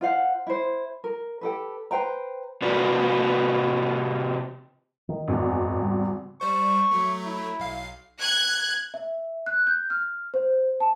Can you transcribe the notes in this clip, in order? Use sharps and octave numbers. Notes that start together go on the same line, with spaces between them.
F4 C5 F5 F#5
E4 C5
A#4
G4 A4 B4
B4 C5 G5 A#5
C3 F4 F#4 B4 D5
D#3
G#1 E2
F#2 G#3
C#3 G3
G3 C5 C#6
F#3 A3
E4
B1 F5
F#6 G#6
E5
F#6
G6
F6
C5
A5